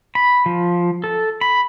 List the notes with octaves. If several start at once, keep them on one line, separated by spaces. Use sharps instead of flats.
B5
F3
A4
B5